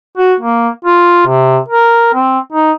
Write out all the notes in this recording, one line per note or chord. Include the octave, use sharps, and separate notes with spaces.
F#4
A#3
F4
C3
A#4
C4
D#4